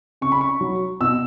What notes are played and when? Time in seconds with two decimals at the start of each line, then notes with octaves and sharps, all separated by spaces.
0.21 C#3 C#6
0.32 B5
0.41 C#6
0.61 F#3
1.01 B2 E6